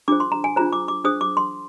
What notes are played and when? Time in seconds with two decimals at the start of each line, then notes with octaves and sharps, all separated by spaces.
0.08 D4 F4 G#4 C5 D6
0.20 C6
0.32 A#5
0.44 G#5
0.56 D4 F4 G#4 C5 A#5
0.73 D6
0.88 D6
1.04 D4 G#4 C5 D#6
1.21 D6
1.37 C6